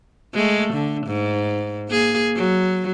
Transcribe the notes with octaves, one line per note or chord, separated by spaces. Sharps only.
G#3 A3
D3
G#2
A#3 G#4
F#3